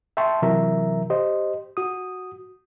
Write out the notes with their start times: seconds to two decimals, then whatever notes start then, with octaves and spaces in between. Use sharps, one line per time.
0.17 E5 G5 A5 C6 C#6
0.42 C3 E3 F#3 A#4 E5 A#5
1.10 G4 C5 D#5
1.77 F#4 D#6